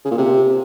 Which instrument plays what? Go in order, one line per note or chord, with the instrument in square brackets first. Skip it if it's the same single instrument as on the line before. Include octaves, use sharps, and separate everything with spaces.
[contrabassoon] C#3
A#2
C3